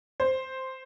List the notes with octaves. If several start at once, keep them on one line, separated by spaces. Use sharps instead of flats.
C5